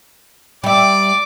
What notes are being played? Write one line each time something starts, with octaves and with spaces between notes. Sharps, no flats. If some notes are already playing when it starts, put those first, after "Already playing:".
G3 D5 E5 D6